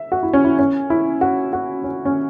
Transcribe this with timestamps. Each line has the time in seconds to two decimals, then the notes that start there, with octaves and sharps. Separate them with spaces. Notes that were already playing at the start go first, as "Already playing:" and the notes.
Already playing: E5
0.12 F#4
0.23 E4
0.33 C#4
0.44 E4
0.59 C#4
0.90 E4
1.21 F#4
1.53 F#4
1.84 C#4
2.05 C#4